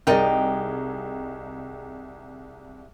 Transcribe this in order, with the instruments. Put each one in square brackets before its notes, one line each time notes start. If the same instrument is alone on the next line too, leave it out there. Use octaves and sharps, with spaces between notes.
[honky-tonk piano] C2 G#4 [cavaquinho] D#4 G4 G5 [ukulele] A#4 D5 D#5